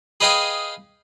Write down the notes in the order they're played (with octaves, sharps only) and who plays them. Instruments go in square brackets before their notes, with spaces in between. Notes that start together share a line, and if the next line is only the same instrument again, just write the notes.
[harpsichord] G#4 B4 D#5 F5 G5 G#5